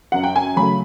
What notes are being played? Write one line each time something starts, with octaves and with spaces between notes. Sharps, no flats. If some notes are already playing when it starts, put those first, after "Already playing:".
F#2 F#5
G5
G#5
C#3 F#3 A3 B5